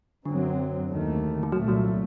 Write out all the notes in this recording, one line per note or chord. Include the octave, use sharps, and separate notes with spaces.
F#2 D3 F#3 C4
D#2 D#3 A3
D#3
C2 A#2 F#3 A3
F#3